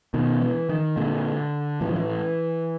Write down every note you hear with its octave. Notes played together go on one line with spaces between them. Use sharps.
B2 D#3
E3
D#3
A#2 D3
A2 E3
F3
E3